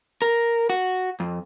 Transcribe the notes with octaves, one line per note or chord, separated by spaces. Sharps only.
A#4
F#4
F2